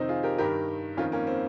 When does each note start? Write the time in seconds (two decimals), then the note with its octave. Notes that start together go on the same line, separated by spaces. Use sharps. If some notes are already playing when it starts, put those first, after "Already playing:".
Already playing: F2 C3 D#3 C4 D#4
0.09 F4 G#4
0.23 G4 A#4
0.38 G2 D#3 G4 A#4
0.97 F2 D#3 C#4 F4
1.12 A#3 C#4
1.27 C4